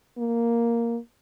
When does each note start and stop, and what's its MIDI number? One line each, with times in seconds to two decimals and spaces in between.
0.18 0.98 58